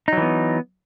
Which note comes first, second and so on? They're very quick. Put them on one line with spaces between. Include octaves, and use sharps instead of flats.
D#4 F#3 E3 B3